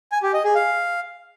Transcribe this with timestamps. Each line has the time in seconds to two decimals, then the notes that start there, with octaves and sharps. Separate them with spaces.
0.12 G#5
0.23 G4
0.34 D#5
0.44 G#4
0.55 F5